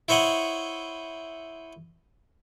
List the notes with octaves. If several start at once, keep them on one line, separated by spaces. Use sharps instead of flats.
E4 C5 C#5 D#5 F#5